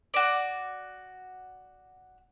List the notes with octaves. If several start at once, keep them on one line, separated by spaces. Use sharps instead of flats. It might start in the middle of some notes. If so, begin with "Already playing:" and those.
F#4 D5